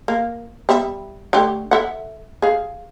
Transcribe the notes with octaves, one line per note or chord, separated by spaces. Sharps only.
A#3
G3 B3 E5
D3 A3 G4
A4 E5 F#5
G#4 F5